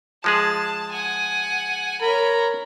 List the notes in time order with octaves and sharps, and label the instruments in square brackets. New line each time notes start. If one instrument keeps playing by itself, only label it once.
[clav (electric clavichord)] F3 G#3 G#4 [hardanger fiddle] A5
[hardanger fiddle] F#5 G#5
[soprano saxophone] A#4 [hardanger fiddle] C#5 B5